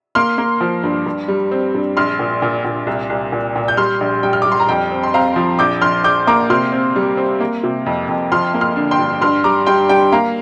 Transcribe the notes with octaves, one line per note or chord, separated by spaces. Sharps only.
A#3 C6 F6
A#3
F3
G2
G2
G3
C4
G2
A#1 C6 F6
A#2
A#2
A#2
C2
C2
A#2
A#2
G6
G3 C6 F6
A#1
G3 G5
F6
D6
G3
C6
A#5
F2 G5
C4
C6
C4 F5 A#5
F3
A#1 D6 G6
A#1 C6 F6
A#1 D6 G6
A#3 A#5 D6
C3 C6 F6
C4
G3
C4
A#3
C3
F2
F2
F3 C6 F6
A#3
C6 F6
D3
G5 C6
G2
G2 C6 F6
G3 A#5 D6
G3 G5 C6
G3 G5
A#3 F5 A#5